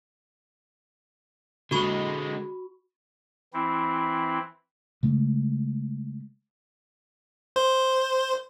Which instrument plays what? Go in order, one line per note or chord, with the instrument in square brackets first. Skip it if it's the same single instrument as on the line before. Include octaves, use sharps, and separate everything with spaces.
[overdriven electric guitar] D3 G#3 [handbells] F#4 B5 C#6
[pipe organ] E3 C4 E4
[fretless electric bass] C#3 G#3 A3
[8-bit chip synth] C5